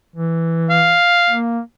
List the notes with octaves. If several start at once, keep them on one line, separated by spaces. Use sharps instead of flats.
E3
F5
A#3